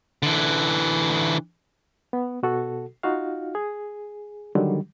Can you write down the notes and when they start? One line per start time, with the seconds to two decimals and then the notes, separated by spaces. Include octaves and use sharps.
0.23 D3 E3
2.13 B3
2.43 B2 F#4 A4
3.03 D#4 F4 F#4 F5
3.55 G#4
4.55 D3 D#3 F#3 G3